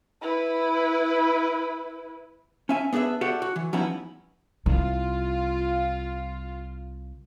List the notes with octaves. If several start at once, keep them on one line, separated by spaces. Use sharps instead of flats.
E4 B4
C#4 E5 G#5
B3 D4 G#4 B4 E5
F#4 G4 A4 D5 E5 F#5
F#4
E3
F3 G3 B3 C#4 D#4 E4
C2 E4 F4